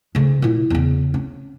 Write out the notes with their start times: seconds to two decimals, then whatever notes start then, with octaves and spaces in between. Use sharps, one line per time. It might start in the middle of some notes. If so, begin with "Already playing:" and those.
0.15 D2 C#3
0.42 A#2 E4
0.70 E2 C#3
1.14 C#4